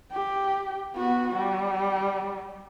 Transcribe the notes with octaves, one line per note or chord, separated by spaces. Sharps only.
G4
B3 F#4
G3